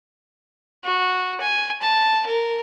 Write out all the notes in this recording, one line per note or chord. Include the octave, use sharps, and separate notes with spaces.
F#4
G#5
A5
A#4